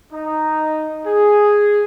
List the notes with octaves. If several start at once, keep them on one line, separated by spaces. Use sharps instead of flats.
D#4
G#4